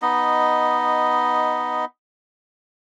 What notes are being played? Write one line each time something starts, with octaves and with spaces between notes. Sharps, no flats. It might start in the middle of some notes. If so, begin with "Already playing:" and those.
B3 D#4 D#5